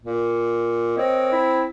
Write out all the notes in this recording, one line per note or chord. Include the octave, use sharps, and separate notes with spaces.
A#2
C4 A#4 C#5 D#5
E4